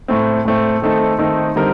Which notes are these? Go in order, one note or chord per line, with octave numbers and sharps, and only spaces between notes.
A2 A3 C4
A2 A3 C4
D#3 A3 C4 D#4 A4
D#3 A3 C4 D#4 A4
D3 G3 C4 D#4 A#4